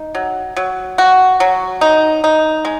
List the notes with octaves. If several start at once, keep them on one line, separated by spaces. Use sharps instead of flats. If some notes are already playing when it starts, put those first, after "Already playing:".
Already playing: D#4
F#3
F#3
F#4
F#3
D#4
D#4
G#3